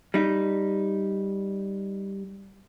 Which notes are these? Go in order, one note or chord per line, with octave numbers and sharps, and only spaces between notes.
G3 D#4